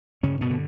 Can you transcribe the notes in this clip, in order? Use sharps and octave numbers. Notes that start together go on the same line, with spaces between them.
G2 C#3 C#4
B2 B3
D3